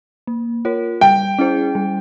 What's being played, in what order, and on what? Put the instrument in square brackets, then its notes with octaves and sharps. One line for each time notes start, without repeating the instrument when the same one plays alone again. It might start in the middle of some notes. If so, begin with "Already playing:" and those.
[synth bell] A#3
F4 A#4 C#5
[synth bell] G3 [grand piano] G5
[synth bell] C#4 E4 G#4 C5
G3